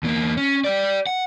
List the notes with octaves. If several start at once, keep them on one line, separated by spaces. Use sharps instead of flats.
E2 A#3
C#4
G4 D5
F#5